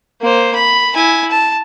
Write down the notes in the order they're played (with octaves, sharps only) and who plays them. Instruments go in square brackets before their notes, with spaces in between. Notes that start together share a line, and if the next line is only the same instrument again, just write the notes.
[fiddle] A#3 C5
B5
E4 G#5
A5